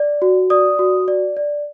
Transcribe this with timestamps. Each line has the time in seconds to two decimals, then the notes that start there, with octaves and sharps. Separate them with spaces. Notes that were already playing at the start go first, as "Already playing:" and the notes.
Already playing: D5
0.22 F#4
0.50 D5 D#6
0.79 F#4
1.08 D5
1.37 D5